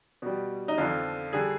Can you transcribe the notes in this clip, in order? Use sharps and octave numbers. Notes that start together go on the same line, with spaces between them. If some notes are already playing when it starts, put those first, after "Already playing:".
B2 G3
D#4
F2 D3 F3 F4
D3 G3 G#4